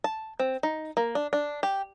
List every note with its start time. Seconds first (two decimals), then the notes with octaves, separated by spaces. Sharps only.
0.04 A5
0.40 C4
0.63 D#4
0.97 A#3
1.15 D4
1.33 D4
1.63 G4